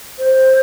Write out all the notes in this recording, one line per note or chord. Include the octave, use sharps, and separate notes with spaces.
C5